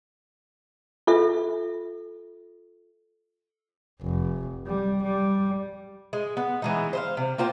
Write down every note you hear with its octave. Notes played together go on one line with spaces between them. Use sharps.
F4 A4 E5
F1
G3
G3
G#3
B3
E3 G#3 D#4
C5 D#5 F5
C3
A#3 F4 C5 G5